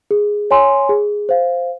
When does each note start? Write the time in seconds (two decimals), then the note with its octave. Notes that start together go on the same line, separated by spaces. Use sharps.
0.11 G#4
0.51 C#5 G#5 C6
0.89 G#4
1.29 C5 F5